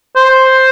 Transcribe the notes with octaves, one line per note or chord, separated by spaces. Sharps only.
C5